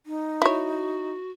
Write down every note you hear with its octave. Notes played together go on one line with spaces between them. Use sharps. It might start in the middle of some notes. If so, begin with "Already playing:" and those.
D#4
E4 F#4 C#5